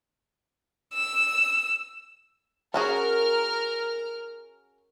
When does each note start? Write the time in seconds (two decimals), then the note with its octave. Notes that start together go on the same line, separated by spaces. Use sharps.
0.93 E6
2.74 C#4 F#4 G#4 A#4 F6